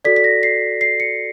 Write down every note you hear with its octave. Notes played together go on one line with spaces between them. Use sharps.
F#4 A4 D5 B6
B6
A#6
C7
C7
C#7